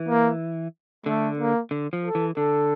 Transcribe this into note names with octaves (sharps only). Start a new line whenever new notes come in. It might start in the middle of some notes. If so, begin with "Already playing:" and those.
Already playing: E3
A#3
D3 A3
A#3
D3
F3
A4
E3
D3 A4